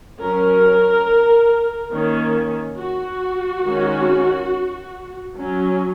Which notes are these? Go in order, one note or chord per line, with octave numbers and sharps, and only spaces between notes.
F#3 C#4 A#4
D#3 A#3 C#4
F#4
D#3 G#3 C#4
F#3 C#4